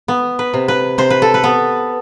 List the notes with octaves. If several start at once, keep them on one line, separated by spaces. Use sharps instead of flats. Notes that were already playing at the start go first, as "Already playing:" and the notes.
B3
B4
C3
B4
C3 C5
B4
A4
B4
B3